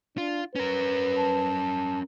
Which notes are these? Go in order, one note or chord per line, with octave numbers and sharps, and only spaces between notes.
D4 F4
C#4 A#4 B4
A5